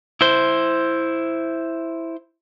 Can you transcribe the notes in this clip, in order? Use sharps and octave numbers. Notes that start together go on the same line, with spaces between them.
E4 C5